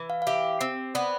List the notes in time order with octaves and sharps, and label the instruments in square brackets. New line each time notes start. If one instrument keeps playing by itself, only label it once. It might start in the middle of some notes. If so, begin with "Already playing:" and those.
Already playing: [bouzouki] E3
[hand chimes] F5
F5
[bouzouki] G4 [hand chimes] E5
[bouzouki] C4
[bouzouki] B3 [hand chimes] D5